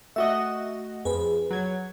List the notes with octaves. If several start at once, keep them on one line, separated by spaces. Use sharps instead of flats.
A3 F#4 D#5 E5
F2 G#4 B4
F#3 G#6